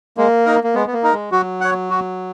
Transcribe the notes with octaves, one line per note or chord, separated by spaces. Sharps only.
G#3 A#3
D#4 A#4
A#3
G#3 B3
B3
A#3
D#4 A#4
G#3
F#3 F#4
C#5 F#5
F#4